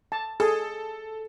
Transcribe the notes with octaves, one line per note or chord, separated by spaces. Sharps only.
A5
G#4 A4